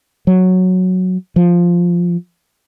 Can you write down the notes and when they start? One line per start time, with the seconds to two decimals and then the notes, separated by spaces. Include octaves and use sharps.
0.27 F#3
1.36 F3